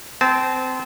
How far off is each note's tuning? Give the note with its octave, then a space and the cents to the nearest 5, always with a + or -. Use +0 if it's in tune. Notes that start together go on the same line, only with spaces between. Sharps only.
C4 -20 A5 -30